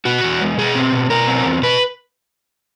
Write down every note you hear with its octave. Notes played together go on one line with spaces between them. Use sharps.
B2 F#4
E2
G#3
B2 G#4
C4
B2
B2 A#4
C4
E2
B2 B4